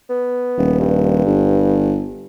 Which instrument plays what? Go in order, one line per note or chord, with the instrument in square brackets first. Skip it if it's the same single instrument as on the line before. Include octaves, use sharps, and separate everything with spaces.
[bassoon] B3
[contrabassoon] D#1
[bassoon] G2
[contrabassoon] G1